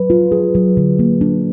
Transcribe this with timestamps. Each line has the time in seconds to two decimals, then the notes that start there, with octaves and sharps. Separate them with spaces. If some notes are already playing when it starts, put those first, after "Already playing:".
Already playing: F#3 B4
0.10 F4
0.32 G#4
0.55 F#3
0.77 D3
0.99 A#3
1.21 D4